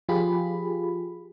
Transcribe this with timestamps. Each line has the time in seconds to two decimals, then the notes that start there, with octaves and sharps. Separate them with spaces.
0.09 F3 F4 G4 G#4 B5